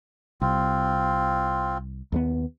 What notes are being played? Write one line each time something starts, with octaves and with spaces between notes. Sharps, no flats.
C2 C4 F4
D#2 G#3 B3